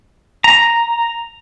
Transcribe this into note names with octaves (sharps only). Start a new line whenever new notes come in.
A#5